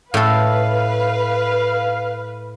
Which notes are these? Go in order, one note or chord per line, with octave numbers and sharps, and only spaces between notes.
A2 A4 B4 F5